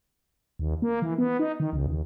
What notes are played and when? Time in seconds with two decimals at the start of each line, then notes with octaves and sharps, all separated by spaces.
0.59 D#2
0.82 A#3
1.02 E3
1.18 B3
1.39 D#4
1.60 D#3
1.73 C#2
1.87 D#2